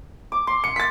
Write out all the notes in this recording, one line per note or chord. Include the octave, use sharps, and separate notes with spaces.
D6
C6
C#7
A6 B6